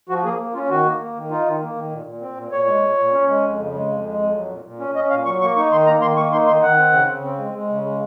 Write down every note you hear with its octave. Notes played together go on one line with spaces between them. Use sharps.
F3 F#4
A#3 G#4
A#3
C#4 F4
D#3 F#4
A#3
A#3
D#3
D#4 F4
D#3
A#3
D#3
A#2
A#2
C4
A#2
A#2 C#5
G#3
A#2
A#2
C#4
G#3
F2
C#3
G#3
F2
G#3
F2
F#3
A#2
A#2
C#4
C#4 D#5
A#2 F5
F#3 C#6
A#3 C#6
D#4 C#6
D#3 C6
A#3 A#5
D#3 C6
A#3 C#6
D#4 C6
D#3 C6
D#3 F#5
C4
C#3
C#3
C4
G#3
G#3
C#3
G#3